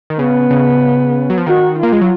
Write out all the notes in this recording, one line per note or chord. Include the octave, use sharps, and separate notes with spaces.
D#3
C#3 B3
C#3
F#3
F3
D#3 F#4
A#3 F4
G#3
F#3